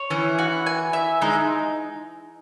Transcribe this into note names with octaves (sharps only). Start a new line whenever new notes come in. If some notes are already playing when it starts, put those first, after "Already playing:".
Already playing: C#5
E3 C#4
F#4
G#5
E5
G#3 D#4